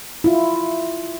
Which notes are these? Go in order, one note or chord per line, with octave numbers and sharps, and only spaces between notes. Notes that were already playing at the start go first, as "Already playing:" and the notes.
E4 F4